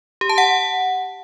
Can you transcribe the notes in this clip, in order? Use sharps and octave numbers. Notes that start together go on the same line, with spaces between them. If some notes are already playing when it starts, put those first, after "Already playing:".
G4
A5
F#5